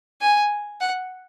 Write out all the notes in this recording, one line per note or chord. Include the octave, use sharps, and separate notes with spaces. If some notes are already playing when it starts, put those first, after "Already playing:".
G#5
F#5